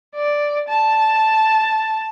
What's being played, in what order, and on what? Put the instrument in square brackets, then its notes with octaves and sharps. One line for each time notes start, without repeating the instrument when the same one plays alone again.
[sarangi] D5
A5